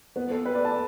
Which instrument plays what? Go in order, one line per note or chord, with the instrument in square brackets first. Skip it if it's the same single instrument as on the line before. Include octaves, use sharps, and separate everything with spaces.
[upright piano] B3
A4
B4
D5
A5